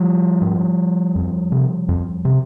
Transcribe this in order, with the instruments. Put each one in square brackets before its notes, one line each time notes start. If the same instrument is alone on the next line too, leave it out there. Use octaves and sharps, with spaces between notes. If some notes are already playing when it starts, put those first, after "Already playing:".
Already playing: [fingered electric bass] F3 G3
G#2
F2
C3
F2
C3